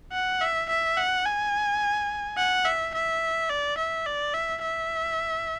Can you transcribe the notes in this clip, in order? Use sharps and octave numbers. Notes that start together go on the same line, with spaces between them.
F#5
E5
E5
F#5
G#5
F#5
E5
E5
D5
E5
D5
E5
E5